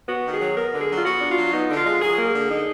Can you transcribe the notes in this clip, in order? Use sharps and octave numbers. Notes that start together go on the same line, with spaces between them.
B3 F#4
D#3
G#4
F#3
B3 A#4
D3
G#4
F#3
F4
B3 F#4
D4
F4
F#3
B3 D#4
D3
F4
G#3
F#3 G#4
A#3
G#4
D3
D#4